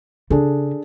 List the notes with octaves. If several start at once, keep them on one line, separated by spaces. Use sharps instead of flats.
C#3 D4 G#4 A4